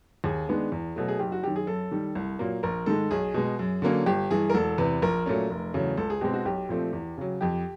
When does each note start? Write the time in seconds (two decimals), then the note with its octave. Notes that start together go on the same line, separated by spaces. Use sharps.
0.24 D#2 G#4
0.48 D#3 G#3 B3 D4
0.72 E2
0.96 B2 F#3 A3
1.08 G#4
1.19 F#1 G4
1.32 F#4
1.43 F#2 D#3 G4
1.56 G#4
1.67 F#2 A4
1.91 D#3 G3
2.15 C2
2.39 A#2 F#3 A#3
2.63 A#1 A#4
2.86 G#2 D#3 G#3 A4
3.11 B1 G#4
3.34 B2 G#3
3.59 F#2
3.82 D3 F#3 A#3 C#4
4.06 G1 G4
4.31 G2 E3 G#4
4.50 A#4
4.54 E1 A4
4.78 E2 C3 B4
5.02 A#1 A#4
5.26 A#2 F#3 A3 C#4
5.50 F1
5.74 E2 C#3 F#3 A3
5.97 C#2 A4
6.10 G#4
6.21 B2 G#3 C4 G4
6.34 F#4
6.45 B1 G4
6.69 A#2 F3 A3 C4
6.93 E2
7.18 C#3 F#3
7.41 F2 G4